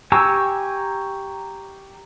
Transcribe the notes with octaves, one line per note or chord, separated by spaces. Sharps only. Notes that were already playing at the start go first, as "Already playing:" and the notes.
G4 G#5 A#5 C#6 E6